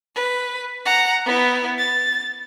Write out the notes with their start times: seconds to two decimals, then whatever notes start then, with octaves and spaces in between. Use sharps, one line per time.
0.15 B4
0.85 F#5 A#5
1.26 B3 E4
1.78 A6